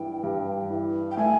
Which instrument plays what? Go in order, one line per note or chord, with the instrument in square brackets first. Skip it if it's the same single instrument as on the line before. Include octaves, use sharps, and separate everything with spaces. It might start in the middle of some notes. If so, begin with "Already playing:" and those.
Already playing: [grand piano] G2 E3 [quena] G5
[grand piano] G2
E3
[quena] G5
[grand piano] A3 [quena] G#5